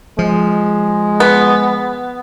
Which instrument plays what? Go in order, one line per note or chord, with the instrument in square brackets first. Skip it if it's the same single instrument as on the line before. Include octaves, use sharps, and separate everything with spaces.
[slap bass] F3 [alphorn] G#3
[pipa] B3